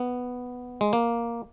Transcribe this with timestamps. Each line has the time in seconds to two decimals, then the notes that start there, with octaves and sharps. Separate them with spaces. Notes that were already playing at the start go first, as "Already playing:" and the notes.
Already playing: B3
0.81 G#3
0.93 A#3